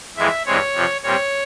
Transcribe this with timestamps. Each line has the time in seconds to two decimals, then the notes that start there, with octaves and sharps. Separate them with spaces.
0.17 F2 E3 G#3 E5
0.45 G2 E3 G#3 C4 C#5
0.74 F2 C3 F3
1.03 A#2 G3 C4 C#5